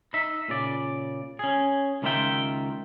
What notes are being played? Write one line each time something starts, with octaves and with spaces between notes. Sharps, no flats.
D#4 E5
A#2 C#3 D5
C#4 G#4
C#2 D#3 A#3 F4 E5 G5